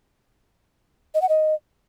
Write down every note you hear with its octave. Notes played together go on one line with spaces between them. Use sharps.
D#5
F#5
D#5